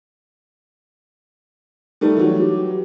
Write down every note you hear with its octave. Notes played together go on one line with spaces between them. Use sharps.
G3 A3 D#4
E3 F#3
G4